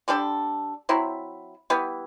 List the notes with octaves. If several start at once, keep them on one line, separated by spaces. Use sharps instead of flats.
D3 G3 D4 A4
F#3 C4 E4
E3 G3 B3